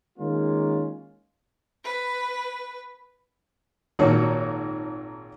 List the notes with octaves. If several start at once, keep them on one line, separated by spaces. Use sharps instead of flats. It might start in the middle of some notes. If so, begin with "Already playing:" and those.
D#3 G#3 A#3 C#4 F4
B4
G#1 A#2 A#3 F#4 C#5